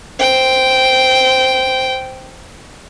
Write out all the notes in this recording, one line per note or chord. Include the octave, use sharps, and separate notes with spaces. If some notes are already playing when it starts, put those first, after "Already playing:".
C5 G5